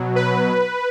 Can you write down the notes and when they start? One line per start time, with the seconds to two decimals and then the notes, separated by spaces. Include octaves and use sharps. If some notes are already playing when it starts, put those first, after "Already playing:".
Already playing: B2 F#3
0.16 B4